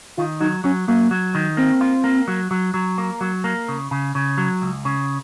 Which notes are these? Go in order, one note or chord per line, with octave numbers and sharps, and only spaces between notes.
D#3 F4
F#3 D#4
F#3 C#4
F#3 A#3
F#3
D#3
A#3 C4
F4
A#3
F#3
F#3
F#3
A#3
F#3
A#3
C#3
C#3
C#3
F#3
C#2
C#3